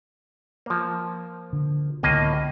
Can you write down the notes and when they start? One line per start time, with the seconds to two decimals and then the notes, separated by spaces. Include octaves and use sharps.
0.66 F3 A#3
1.53 D3
2.03 C#2 A2 D3 A#3 B3 D#5